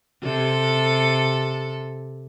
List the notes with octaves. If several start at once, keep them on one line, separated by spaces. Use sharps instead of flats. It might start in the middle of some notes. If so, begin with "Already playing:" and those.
C3 A4